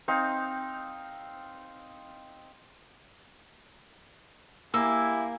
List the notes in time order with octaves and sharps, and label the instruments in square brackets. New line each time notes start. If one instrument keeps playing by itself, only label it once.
[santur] C4 D#4 F5
[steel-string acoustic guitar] A#3 [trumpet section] E4 G4 G#5 [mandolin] E6